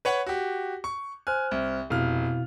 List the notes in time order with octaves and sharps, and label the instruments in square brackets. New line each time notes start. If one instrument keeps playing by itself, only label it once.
[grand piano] B4 C#5 F#5
F#4 G4
C#6
[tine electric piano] C5 F6 F#6 [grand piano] G#5
[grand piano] C2
[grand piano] F1 F6 [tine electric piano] B2 E4 F5